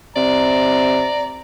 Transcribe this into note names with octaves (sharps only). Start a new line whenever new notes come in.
C3 D5 A#5